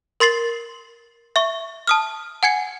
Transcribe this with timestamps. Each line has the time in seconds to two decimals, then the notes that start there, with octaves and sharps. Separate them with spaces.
0.20 A#4 C6 A6 C7 F#7
1.36 E5 C#6
1.87 A5 D#6 F6
2.43 F#5 G#5 G#6 C#7